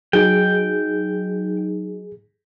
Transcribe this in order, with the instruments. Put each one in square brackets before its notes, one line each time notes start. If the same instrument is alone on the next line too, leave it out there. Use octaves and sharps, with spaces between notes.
[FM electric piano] F#3 D#4 [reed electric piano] G#4 [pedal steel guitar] G5